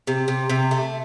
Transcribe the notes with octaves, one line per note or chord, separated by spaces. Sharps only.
C3
C3
C3
A3